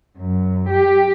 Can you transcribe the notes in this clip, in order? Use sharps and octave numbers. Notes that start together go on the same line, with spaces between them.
F#2
G4